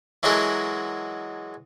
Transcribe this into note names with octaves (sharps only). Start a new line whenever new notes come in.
E3 F#3 G#3 F#4 A4 A#4